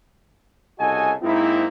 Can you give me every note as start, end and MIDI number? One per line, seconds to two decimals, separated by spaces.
0.79 1.13 36
0.79 1.13 49
0.79 1.13 66
0.79 1.13 69
0.79 1.13 75
0.79 1.13 80
1.22 1.67 44
1.22 1.67 58
1.22 1.67 60
1.22 1.67 63
1.22 1.67 64